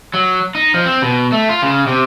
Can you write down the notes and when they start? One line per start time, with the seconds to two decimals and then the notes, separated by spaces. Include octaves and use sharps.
0.14 F#3
0.55 D#4
0.74 F3
0.86 C4
1.02 B2
1.32 A3
1.49 F4
1.62 C#3
1.87 C3